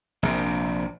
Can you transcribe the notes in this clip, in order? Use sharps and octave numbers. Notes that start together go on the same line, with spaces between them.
A#1 C3